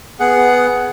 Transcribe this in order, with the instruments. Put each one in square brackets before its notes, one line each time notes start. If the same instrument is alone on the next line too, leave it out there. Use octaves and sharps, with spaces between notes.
[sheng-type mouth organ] B3 G#4 F#5